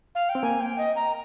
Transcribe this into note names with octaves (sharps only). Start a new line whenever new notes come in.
F5
G5
C4
A#3 G#5
G5
D#5
A#5